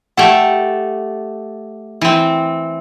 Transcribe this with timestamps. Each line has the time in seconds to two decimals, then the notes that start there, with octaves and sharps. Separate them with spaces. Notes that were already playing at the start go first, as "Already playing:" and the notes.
0.17 A3 G4 A4 F#5
2.01 E3 C4